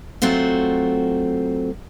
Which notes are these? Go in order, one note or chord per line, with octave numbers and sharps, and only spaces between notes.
F#3 A3 C4 F4 F#4